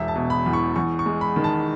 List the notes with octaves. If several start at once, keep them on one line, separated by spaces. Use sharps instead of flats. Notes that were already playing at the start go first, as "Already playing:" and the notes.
Already playing: E1 E5
A5
B2
B5
E2
C#6
E2 C#6
C#6
G#3
B5
D#3
A5